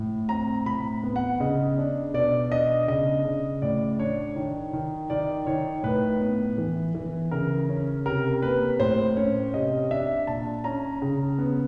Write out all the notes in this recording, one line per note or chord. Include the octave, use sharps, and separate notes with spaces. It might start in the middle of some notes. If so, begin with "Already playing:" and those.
Already playing: A2
C4 A#5
A2 B5
B3
F#5
C#3 D#5
D4
B2 D5
D4 D#5
C#3 D#5
C#3
A2 D5
D4 C#5
D#3
D#3
D#3 D5
D#3 C#5
A2 B4
B3
E3
E3
C#3 A#4
C#4
C3 A#4
A#3 B4
A2 C5
C#4 C#5
C3 D#5
D4 E5
A#2 A5
C#4 A#5
C#3
B3